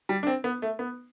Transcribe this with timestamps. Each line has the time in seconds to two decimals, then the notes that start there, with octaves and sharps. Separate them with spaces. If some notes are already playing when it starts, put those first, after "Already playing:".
0.09 G3
0.23 D4
0.27 C4
0.44 B3
0.62 A3
0.79 B3